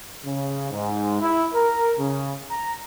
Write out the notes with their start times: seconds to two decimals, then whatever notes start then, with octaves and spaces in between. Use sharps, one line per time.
0.24 C#3
0.72 G#2
1.21 E4
1.53 A#4
1.98 C#3
2.50 A#5